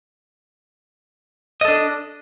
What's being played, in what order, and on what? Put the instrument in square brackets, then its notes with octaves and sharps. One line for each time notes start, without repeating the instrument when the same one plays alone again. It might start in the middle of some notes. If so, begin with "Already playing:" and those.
[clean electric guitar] D#5
A4
D4